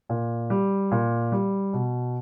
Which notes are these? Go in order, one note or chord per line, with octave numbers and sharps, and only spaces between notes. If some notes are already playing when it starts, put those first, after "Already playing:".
A#2
G3
A#2
G3
B2